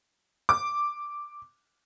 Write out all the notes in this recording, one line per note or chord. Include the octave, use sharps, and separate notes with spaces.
D6